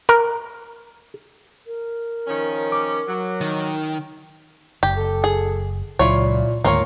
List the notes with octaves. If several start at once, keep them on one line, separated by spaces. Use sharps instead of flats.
A#4
A#4
D#3 F3 C#4
D6
F#3
D#3
F#1 G4
A4
G#4
C#2 A#2 F#3 E4 F4 C#5
D2 G#2 D#3 A#3 F4 C#5